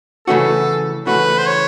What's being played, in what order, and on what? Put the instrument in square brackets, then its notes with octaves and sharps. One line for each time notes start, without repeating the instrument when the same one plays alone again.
[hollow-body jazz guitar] C#3 E3 A3 C#4 F#4 [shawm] A4
[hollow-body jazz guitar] C#3 E3 A3 C#4 F#4 [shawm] B4
[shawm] C5
C#5